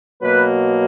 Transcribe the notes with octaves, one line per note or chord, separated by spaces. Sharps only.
B2 F#3 A#3 B4